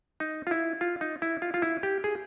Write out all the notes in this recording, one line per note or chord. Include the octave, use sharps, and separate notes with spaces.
D#4
F4
E4
F4
D#4
E4
F4
F4
E4
G4
G#4